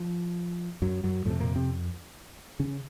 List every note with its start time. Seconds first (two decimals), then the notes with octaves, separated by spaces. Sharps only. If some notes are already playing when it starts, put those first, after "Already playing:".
Already playing: F3
0.82 F#2 F#3
1.03 F#2 F#3
1.25 F2 A2 C3 A3
1.40 A#2 A#3
1.56 C3 C4
2.59 C#3 C#4